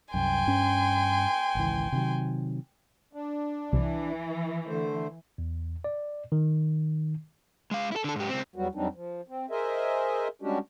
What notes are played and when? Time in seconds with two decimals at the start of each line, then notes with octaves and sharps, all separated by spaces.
0.14 C2 F#2 G5 G#5 C6
0.47 G2 C#4
1.55 G#1 C#2 E3
1.92 C3 D#3 F#3
3.13 D4
3.73 C2 C3 E3
4.67 D3 A3 C5
5.38 E2
5.84 D5
6.32 D#3
7.71 G#3 F5
7.92 E4 A4
8.04 D3 A4
8.16 G#2 G4
8.29 C#2 C4
8.56 E2 F#3 G3 B3 F#4
8.75 F2 F#3 G3 C4 D4 D#4
8.95 F3
9.28 C4
9.50 G#4 A#4 C5 D#5 E5 G#5
10.42 G3 G#3 C#4 D4 F#4 G4